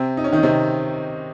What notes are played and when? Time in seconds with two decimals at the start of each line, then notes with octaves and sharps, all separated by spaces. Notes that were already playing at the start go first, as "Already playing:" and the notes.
Already playing: C3 C4
0.17 D#4
0.24 C#4
0.33 D#3 D#4
0.43 C3 C4